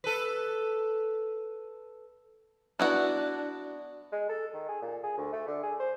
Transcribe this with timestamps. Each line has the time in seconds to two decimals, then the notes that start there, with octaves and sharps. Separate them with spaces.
0.04 A4 B4
2.80 B3 D4 E4 F#4
4.12 G#3
4.29 A4
4.54 D#3
4.69 G#4
4.82 A#2
5.03 G#4
5.18 D2
5.33 A3
5.48 D3
5.63 G#4
5.80 C5